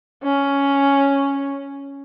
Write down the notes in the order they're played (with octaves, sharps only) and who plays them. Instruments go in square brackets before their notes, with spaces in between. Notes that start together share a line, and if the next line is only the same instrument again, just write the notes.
[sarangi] C#4